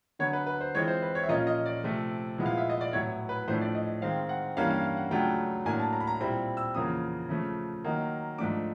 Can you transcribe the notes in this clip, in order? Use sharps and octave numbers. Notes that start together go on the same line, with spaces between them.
D3 F#3 B3 C#5
B4
B4
C5
E3 G#3 C4 F4 C#5
C5
B4
C#5
E5
A#2 F3 A#3 C#4 F4 D#5
D#5
D5
C3 F3 A3
A#2 F3 G#3 B3 E4
F5
E5
D#5
D5
A2 F#3 B3 E4 C#5
B4
A2 F3 A3 D4 C5
D5
D#5
D#3 G#3 C4 F5
F#5
G2 E3 G3 A#3 C#4 F5
F5
F5
F#5
C#3 F#3 A3 D4 F4 G5
A2 F#3 A#3 D4 G#5
A5
A#5
B5
A#5
A#2 G3 C4 E4 B5
E6
E2 C#3 F3 A#3 D#6
C#3 F3 A3
D#3 F#3 A#3 D#4
G#2 F3 A3 D4 D6